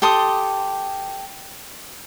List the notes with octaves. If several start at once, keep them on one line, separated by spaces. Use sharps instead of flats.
G4 A4 C6 D#6